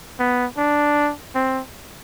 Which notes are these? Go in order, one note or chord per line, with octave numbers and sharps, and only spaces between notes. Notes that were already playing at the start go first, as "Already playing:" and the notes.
B3
D4
C4